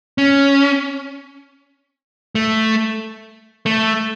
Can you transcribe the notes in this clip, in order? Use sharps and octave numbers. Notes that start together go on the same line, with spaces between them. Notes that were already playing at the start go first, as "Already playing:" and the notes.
C#4
A3
A3